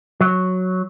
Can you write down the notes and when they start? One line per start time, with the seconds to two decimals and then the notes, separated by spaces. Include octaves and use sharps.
0.20 F#3